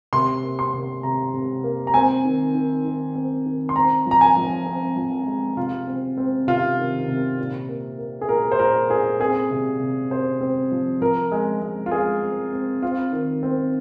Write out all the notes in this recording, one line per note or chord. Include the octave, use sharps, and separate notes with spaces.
C3 C6
A#3
C6
C3
C3 A#5
C3
A#3
A#5
C4 G#5
D#3
D#3
D#3
C4
D#3
C6
C4 A#5
F3 A#5
G#5
F3
C4
F3
G#3
C3 F4
C4
C4
C3 F4
D#3
C3
A#2
A#3
A#3
G#4
A#2 A#4
C5
A#2 A#4
A#2 G#4
C4 G#4
C3
C3
C3 C5
C4
F3
F3 A#4
G#3
G#3
F4
G#3 G#4
C4
C4
C4 F4
D#3
C4